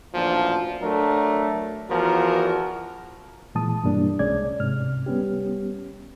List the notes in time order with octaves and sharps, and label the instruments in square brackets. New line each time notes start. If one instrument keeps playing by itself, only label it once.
[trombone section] A1 D2 A#2 F3
F#3 A3 D4 A#4
E2 F3 F#4 A#4
[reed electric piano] A#2 E3 G#3 A5 D#6
G2 B2 E3 G3 A#3 D4
C2 G#3 C#4 D5 G#6
G#2 C3 F6
G3 B3 C#4 G4